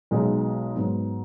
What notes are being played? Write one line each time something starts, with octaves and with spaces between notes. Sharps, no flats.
B1 B2 G#3 D#4
G#2 F#3 B3